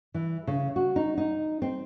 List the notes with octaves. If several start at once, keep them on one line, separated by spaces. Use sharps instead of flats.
E3
C#3
F#4
D#4
D#4
C4